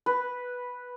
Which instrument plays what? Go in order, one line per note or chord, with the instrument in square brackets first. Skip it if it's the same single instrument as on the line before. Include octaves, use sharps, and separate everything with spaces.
[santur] B4